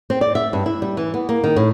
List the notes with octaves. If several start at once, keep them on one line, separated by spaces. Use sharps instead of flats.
C4
D5
E5
G2
E4
G3
E3
B3
A#3
D#3
A2